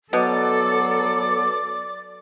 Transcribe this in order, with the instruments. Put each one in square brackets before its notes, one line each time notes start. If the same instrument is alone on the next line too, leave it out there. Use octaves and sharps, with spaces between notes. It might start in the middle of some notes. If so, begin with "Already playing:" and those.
[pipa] B2 [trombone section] F#3 B3 [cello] A4 [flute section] D5 D6